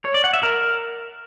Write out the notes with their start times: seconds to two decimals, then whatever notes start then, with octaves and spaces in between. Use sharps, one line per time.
0.05 C#5
0.14 D5
0.24 F#5
0.33 E5
0.43 A#4